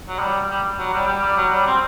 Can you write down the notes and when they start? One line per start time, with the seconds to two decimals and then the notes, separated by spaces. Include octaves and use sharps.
0.08 F#3
0.19 G3
0.49 G3
0.79 F#3
0.93 G3
1.07 G3
1.22 G3
1.37 F#3
1.52 G3
1.66 C4